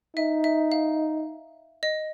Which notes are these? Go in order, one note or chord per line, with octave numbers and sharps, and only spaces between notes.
D#4 E5
E5
F5
D#5